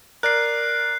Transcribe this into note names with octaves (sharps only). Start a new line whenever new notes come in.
A#4 D5 F#6 C7